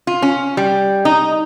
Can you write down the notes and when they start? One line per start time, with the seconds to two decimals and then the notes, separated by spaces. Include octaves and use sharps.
0.07 F4
0.22 C#4
0.57 G3
1.05 D#4